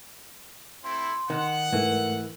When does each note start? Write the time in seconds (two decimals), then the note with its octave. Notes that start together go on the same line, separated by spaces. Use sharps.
0.84 A3 C4 E4 C6
1.30 D#3 F#5
1.73 G#2 E3 A3 A#4